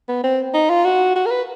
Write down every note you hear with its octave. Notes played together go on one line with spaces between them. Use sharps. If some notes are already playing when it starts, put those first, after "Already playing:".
B3
C4
D#4
F4
F#4
F#4
A#4
B4